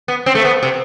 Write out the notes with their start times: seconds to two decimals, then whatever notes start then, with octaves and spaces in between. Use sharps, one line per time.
0.08 B3
0.26 C4
0.35 A3
0.45 B3
0.63 C3